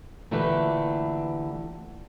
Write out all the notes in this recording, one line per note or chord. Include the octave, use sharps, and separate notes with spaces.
A#2 D3 E3 A3 G4 B4